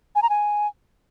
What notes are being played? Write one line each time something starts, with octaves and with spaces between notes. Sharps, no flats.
G#5
A#5
G#5